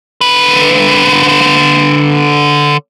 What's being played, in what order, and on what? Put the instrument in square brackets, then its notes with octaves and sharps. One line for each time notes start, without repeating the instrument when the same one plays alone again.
[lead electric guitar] D3 B4